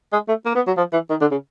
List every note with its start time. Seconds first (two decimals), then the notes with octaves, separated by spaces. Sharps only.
0.13 G#3
0.28 A3
0.46 A#3
0.55 B3
0.67 F#3
0.77 F3
0.93 E3
1.10 D#3
1.21 D3
1.31 C#3